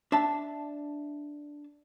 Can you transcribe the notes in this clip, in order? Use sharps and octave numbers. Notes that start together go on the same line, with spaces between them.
D4 E5 A5